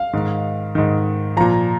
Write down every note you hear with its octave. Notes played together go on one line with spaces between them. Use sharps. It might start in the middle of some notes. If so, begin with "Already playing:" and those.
Already playing: F5
G#2 D#3
G#2 D#3
A#2 F3 A#5